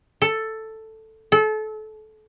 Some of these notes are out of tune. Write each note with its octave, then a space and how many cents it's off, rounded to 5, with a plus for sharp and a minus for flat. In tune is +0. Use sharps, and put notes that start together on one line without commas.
A4 +5
A4 -30